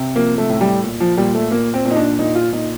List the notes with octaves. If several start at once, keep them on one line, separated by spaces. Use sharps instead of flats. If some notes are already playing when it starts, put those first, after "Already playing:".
Already playing: C3
F3 A#3
A3
A2
G3
A#2
F3
A#2 G3
A3
A#2 A#3
C4
A#2
D#4
D4
A#2 D#4
F4
A#2 D#4